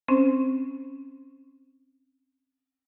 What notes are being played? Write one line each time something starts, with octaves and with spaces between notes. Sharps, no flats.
C4 C#4 C5